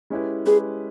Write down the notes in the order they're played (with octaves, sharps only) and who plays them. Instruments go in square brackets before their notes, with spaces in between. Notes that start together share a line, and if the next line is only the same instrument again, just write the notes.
[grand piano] G#3 C#4 E4 G4 B4
[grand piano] G#3 C#4 E4 G4 B4 [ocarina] G#4